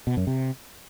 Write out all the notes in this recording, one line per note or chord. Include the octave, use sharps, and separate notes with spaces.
B2
F#2
C3